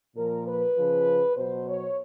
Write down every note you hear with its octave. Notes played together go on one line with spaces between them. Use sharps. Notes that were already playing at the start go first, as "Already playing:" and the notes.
A#2 F3 A#4
B4
C#3 F3
B2 F#3 C5
C#5